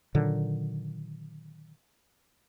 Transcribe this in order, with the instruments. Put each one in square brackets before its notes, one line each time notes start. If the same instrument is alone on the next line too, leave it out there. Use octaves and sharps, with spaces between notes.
[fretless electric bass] A#2 D3 D#3 F#3